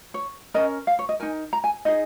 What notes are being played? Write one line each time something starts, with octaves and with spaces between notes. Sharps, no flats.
C#5
C#4 A#4 D#5
F5
C#5
D#5
D#4 A#4 G#5
A#5
G#5
D#4 G#4 D#5